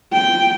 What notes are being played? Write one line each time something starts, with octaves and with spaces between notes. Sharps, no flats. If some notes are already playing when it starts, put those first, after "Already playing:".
G5